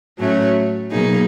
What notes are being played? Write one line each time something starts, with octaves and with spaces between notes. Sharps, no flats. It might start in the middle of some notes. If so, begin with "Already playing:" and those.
A2 F#3 A3 C#4
B2 F#3 A#3 D#4 G#4